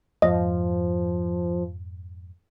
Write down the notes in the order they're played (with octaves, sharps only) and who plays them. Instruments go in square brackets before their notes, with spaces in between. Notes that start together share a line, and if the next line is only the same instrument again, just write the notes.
[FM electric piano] F2 G#2 [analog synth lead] F3 [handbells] D#5